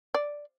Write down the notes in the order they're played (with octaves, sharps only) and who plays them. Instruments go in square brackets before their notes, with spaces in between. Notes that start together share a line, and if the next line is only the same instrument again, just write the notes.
[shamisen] D5